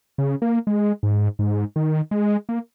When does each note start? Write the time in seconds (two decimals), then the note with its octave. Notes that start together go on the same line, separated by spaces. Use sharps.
0.18 C#3
0.42 A#3
0.67 G#3
1.03 G#2
1.39 G#2
1.76 D#3
2.11 G#3
2.49 A#3